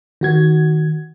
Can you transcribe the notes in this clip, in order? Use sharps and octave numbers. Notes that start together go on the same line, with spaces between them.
D#3 F#4 G#6